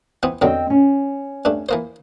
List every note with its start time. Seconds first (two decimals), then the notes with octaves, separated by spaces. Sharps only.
0.23 E3 B3 C4
0.42 E2 D3 F#3 C4 D#5 G5
0.70 C#4
1.45 G2 A3 D4
1.69 E3 A#3 C5